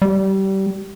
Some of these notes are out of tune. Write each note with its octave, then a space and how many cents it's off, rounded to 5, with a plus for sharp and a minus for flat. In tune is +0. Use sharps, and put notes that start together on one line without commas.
G3 -25